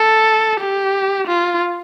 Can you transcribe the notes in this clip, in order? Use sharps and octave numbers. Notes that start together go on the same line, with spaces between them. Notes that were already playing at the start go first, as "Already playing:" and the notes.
Already playing: A4
G4
F4